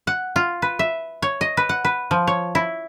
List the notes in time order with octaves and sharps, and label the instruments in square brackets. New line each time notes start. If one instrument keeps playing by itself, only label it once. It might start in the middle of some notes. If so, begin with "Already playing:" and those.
[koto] F#5
F4
B4
E5
C#5
D#5
B4
F#5
B4
F3
C#5
E4